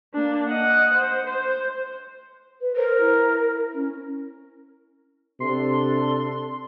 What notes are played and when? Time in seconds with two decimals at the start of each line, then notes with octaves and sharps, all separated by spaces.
0.14 A#3 D4
0.48 D#5 F#5
0.93 C5
1.27 C5
2.61 B4
2.76 A#4 C5
3.01 E4
3.74 C#4
5.40 C3 D4 A4 C6